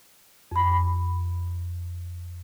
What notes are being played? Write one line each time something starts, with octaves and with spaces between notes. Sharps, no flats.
F2 B5